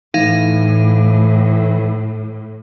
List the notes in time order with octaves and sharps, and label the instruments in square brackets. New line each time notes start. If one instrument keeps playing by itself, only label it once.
[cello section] A2 [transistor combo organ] E3 [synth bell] D#4 F5